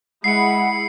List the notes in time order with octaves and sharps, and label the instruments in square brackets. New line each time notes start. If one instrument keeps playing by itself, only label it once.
[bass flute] G#3 [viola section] E4 G#4 B5 [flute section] F#5 [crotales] C7 C#7